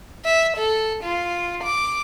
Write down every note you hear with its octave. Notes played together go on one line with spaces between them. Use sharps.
E5
A4
F4
D6